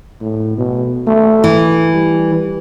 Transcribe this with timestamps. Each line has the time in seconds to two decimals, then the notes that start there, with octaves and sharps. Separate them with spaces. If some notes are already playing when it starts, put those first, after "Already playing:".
0.21 A2
0.58 B2
1.07 A3
1.44 E3
1.93 G3